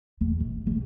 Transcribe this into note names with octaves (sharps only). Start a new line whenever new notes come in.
E2
G1
C2